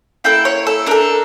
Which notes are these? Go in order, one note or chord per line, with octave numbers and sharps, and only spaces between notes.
A#3 E4 A4 G5
C#5
A4
D4 A4 A#4